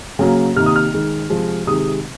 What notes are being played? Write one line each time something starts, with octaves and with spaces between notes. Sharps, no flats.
C#3 F#3 A#3
C3 D#3 A#3 F6
D#6
F6
D#3 G#3
C3 F3 G#3
C3 D#3 G#3 D#6